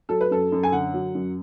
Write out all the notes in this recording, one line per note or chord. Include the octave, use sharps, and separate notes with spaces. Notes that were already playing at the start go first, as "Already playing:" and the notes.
F#3 A4
B4
F#2 A4
F#2
G#5
D3 F#5
F#3
F#2